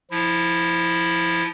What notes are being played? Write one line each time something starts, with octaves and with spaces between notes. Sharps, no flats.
F3 E4